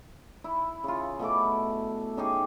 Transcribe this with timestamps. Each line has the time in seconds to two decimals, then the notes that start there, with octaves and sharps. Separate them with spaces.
0.44 E4
0.84 C#3 F4
1.19 B2 A3 E4 D6
2.17 C#4 D#4 G4 G#4